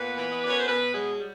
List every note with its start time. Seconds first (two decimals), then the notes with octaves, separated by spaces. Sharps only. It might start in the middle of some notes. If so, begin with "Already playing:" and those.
Already playing: A#2 B3 B4
0.18 E3
0.32 D#5
0.41 F#2 D5
0.50 C#5
0.59 C5
0.68 B2 B3 B4
0.94 F#3 G#3 G#4
1.19 G3